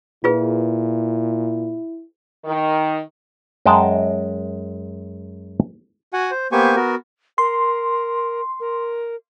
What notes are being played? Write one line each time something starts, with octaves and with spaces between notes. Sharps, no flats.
A#2 E4 F4 G#4 B4
D#3
F#2 G#3 D#5 G5 A5
F#4 F#5 G#5
C5
A#3 B3 G4 C5 G#5 C#6
B3 F#4 A#4
A#4 C6
A#4